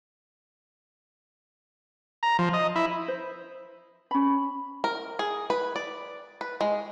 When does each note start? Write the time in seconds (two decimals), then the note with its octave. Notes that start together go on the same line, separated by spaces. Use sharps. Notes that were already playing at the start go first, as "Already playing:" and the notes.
2.23 A#5
2.39 F3
2.53 D#5
2.76 E4
3.08 C5
4.11 C#4 B5
4.84 A#4
5.19 G#4
5.50 B4
5.76 D5
6.41 B4
6.61 G#3